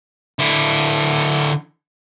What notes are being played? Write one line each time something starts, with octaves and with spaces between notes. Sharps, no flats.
D3 E4